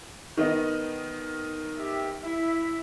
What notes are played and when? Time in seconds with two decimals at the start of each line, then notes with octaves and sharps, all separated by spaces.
0.37 D#3 B3 D#4
1.78 G4 E5
2.24 E4 E5